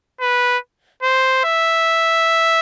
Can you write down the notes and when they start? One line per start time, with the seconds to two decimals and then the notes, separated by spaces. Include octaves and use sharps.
0.20 B4
1.03 C5
1.44 E5